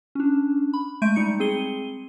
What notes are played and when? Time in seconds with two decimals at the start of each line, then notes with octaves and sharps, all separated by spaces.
0.15 C#4 D4
0.73 B5
1.02 G#3 A3 E5 G6 D7 D#7
1.16 G3 D#4 C#7
1.40 C4 G#4 D#7 G7